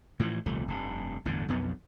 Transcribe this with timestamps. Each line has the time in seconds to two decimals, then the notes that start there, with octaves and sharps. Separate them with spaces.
0.19 A2 E3 F3
0.46 D#1 C2 F3 A3
0.68 F1 G2
1.25 G1 E2 A2 D3
1.48 B1 F2 B2 B3